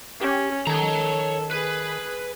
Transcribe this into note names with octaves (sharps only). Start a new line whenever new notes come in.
C#4 G4
D#3 A4 C#5 A#5
G#4 B4